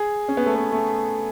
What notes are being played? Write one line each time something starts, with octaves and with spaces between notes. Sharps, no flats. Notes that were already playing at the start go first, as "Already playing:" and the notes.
Already playing: G#4
C#4
B3
A3
B3
A3